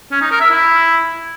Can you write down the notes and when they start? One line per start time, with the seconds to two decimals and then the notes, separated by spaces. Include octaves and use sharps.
0.12 C#4
0.21 D#4
0.31 A#4
0.41 E5
0.51 E4